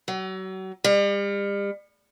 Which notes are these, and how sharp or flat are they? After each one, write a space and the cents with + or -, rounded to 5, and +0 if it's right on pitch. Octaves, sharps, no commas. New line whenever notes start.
F#3 +35
G3 +40